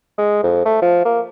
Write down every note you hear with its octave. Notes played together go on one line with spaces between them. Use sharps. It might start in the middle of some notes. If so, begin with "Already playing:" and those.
G#3
F2
A3
F3
A#3